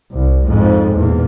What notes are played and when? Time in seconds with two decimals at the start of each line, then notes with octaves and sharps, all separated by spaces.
0.11 C2
0.45 F2 G#2
0.96 E2 A#2